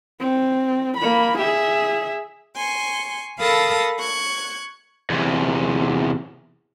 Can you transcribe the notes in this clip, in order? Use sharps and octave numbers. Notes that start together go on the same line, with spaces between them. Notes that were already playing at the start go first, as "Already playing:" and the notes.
C4
A#3 B5
G#4 E5
G#5 C6 C#6
A4 A#4 F5 A5 B5 D#6
C#6 F#6 G#6
E2 C3